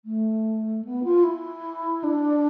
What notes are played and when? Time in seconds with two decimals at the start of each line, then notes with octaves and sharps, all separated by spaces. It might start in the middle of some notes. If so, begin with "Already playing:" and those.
0.05 A3
0.85 B3
1.04 F4
1.23 E4
2.03 D4